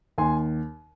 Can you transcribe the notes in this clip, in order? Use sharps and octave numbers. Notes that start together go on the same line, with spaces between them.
D#2 G#5 C6